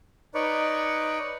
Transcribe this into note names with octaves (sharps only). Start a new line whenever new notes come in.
D#4 B4 C#5 D5